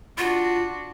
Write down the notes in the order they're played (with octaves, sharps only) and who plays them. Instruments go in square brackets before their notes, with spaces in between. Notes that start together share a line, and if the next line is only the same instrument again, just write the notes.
[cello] D4 F#4 [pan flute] F4